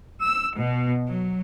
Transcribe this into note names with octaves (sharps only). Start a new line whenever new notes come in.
E6
B2
F#3